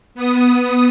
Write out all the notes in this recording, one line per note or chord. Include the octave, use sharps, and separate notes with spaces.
B3 D#6